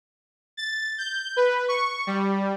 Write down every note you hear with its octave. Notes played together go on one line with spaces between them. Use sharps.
A6
G6
B4
C#6
G3